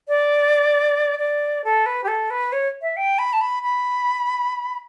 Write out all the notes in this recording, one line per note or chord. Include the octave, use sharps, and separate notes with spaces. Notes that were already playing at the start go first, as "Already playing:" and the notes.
D5
D5
A4
B4
G4
A4
B4
C#5
E5
G5
B5
A5
B5
B5